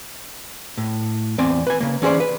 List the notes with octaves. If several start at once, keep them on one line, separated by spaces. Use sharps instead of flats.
A2
E2 C4 D5 G#5
B4 G#5
C#3 A#3
E3 C#4 G#4 C5 D5
B4